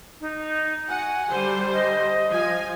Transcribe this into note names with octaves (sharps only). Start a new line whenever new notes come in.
D#4
F#4 F#5 G#5
D3 G3 C5
D#5
F3 G#5